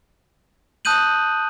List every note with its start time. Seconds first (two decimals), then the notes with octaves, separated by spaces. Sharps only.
0.85 A5 D#6 F#6 G6 D#7 F#7